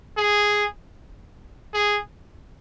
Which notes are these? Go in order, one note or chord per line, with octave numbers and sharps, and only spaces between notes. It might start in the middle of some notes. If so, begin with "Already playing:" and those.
G#4
G#4